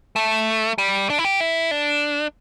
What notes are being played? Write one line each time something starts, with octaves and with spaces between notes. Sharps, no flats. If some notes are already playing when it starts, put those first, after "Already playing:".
A3
G3
D4
E4
G4
E4
D4